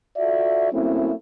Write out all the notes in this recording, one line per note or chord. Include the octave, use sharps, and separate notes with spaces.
F4 F#4 A4 D5 E5
F#3 A3 A#3 C4 C#4 E4